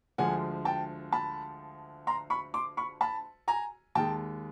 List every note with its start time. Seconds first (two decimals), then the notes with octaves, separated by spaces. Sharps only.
0.18 D2 D3 F3 G#3 F#5 G#5
0.65 G5 A5
1.12 A5 B5
2.07 A#5 C6
2.30 B5 C#6
2.54 C6 D6
2.77 B5 C#6
3.01 A5 B5
3.48 G#5 A#5
3.95 D#2 D#3 G#3 G5 A5